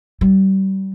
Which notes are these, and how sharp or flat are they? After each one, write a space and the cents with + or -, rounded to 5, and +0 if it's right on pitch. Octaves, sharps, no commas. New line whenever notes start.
G3 -30